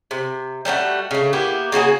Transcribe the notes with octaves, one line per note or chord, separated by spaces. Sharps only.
C3
G3 A3 D4 F#4
C#3 A3
A#3 B3 E4 G4
C#3 A#3 F#4 G#4